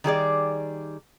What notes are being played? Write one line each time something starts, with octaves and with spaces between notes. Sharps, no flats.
D#3 G3 G#4 D5